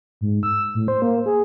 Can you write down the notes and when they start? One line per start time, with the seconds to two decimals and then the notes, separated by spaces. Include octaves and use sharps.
0.21 G#2
0.43 E6
0.75 A2
0.88 C5
1.02 A#3
1.26 G#4